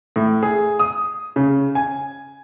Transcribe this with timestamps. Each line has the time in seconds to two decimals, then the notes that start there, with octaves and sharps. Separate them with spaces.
0.16 A2
0.43 G#4
0.79 D#6
1.36 C#3
1.75 G#5